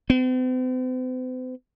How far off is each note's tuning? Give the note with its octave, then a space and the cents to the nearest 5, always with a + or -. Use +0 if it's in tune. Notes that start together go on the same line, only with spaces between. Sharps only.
C4 -45